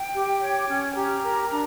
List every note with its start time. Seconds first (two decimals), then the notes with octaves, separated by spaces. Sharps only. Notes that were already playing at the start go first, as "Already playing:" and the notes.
Already playing: G5
0.15 G4
0.41 C#5
0.68 C#4
0.95 G4 A#5
1.22 A#4
1.49 D4